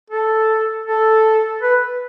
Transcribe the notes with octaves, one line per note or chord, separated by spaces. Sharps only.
A4
A4
B4